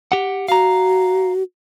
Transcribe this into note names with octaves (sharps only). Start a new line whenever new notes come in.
G4 F#5
F#4 F5 A#5